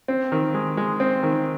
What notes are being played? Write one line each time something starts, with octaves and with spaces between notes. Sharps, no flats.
C4
D#3
G#3
G#3
C4
D#3